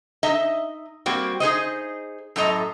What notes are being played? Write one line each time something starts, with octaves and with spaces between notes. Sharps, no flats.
D#4 D#5 E5
G3 A#3 C4 F#4
D#4 G#4 C5 D#5
F#2 A2 A4 D#5 A#5